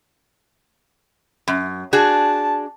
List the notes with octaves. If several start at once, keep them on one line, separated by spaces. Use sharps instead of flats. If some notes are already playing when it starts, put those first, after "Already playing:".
F#2
D4 F#4 G#4 A5